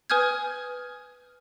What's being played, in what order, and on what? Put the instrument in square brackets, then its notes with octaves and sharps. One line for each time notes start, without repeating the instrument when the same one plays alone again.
[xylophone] B4 G#5 D#6 F6 G6 G#6